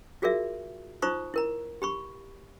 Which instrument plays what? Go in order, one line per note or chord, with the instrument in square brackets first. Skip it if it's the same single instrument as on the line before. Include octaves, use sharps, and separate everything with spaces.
[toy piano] F4 F#4 G#4 A#4 D5 E5
D#4 F4 C5 A#5 C#6 D#6
E4 A#4 A#5
G4 B5 C#6